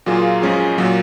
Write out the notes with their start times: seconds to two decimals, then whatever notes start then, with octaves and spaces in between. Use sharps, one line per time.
0.06 A#2 F#3 A#3 F4 G#4
0.42 F#2 F3 G#3 C#4 G#4
0.77 A#2 F#3 A#3